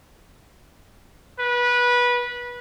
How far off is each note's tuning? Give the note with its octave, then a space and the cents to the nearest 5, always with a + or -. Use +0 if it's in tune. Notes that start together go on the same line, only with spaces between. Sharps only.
B4 -20